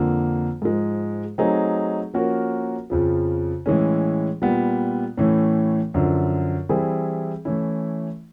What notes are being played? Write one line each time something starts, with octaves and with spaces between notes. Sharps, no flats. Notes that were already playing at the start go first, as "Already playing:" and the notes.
Already playing: F2 D3 F3 A#3
G#2 F3 G#3
F#3 A3 C4 D#4 G#4
F3 A#3 C#4 F#4 A#4
F2 C#3 F3
A2 E3 G#3 C#4
A#2 G3 B3
A2 E3 A3 C#4
F#2 D3 F3
E3 G3 C4 E4 G#4
E3 A3 C#4 E4